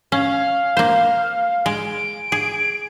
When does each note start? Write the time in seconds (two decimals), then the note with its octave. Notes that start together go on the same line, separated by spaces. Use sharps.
0.12 C#4 F5
0.77 A#3 C5
1.66 G#3 D7
2.32 G#4